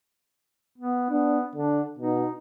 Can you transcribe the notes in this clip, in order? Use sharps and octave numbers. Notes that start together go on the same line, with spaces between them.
B3
B3 D4
D3 D4
B2 D#4